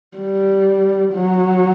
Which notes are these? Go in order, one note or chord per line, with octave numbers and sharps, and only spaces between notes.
G3
F#3